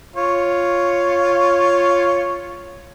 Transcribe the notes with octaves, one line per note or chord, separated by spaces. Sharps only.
F4 C#5